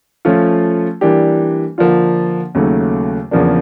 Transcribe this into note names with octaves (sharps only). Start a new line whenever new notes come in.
F3 A3 C#4 F4
E3 G3 A#3 D4 G4
D3 F3 A#3 D4 F4
D#2 C#3 F#3 A3
E2 C#3 F3 A#3 D4